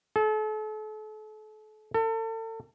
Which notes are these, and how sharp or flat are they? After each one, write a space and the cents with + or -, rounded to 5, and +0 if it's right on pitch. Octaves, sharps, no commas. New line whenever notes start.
A4 -40
A4 +35